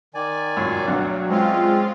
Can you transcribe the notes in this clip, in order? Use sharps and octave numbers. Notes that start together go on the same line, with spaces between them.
D#3 D5 G#5
C#2 F#2 A#2 C#5
D2 G2 B2 F#3
G#3 C4 C#4 F4 C5